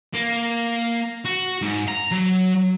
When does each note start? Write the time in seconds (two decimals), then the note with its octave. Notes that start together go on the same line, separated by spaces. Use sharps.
0.14 A#3
1.25 F#4
1.62 G#2
1.88 A#5
2.11 F#3